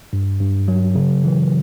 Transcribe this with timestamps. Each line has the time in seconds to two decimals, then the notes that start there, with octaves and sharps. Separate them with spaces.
0.13 G2
0.41 G2
0.68 F#3
0.95 C#3
1.24 E3